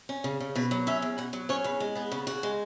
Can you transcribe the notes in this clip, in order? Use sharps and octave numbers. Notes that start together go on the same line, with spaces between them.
C#4
C#3
C#3
B2 B4
F#3
C#4 E5
E2
B2 F#5
F#3
C#4 C#5
E2 B4
G#3
B3 G#4
C#3
C#3 F#4
G#3